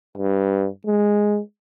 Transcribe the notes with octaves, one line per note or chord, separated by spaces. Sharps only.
G2
G#3